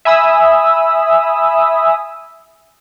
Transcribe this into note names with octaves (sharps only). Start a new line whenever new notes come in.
E5 G#5 B5 D#6 E6